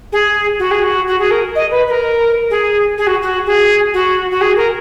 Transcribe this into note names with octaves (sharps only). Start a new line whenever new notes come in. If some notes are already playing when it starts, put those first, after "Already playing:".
G#4
F#4
G#4
F#4
F#4
G#4
A#4
D#5
B4
B4
A#4
G#4
G#4
F#4
F#4
G#4
F#4
F#4
G#4
A#4